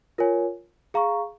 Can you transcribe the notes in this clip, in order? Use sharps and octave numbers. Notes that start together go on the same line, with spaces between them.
F4 A#4 C#5 G#5
G#4 F5 A#5 C#6